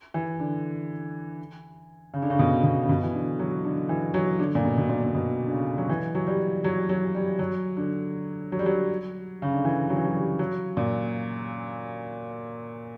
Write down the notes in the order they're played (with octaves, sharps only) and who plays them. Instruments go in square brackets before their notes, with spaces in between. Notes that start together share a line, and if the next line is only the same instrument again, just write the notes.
[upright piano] E3
D3
C#3
D3
C#3
B2
B2
C#3
B2
E3
D3
F#3
D3
E3
F#3
D3
A#2
B2
B2
A#2
A#2
B2
D3
C#3
F#3
E3
F#3
G3
F#3
F#3
G3
F#3
D3
F#3
G3
F#3
C#3
D3
E3
F#3
E3
F#3
G3
F#3
A#2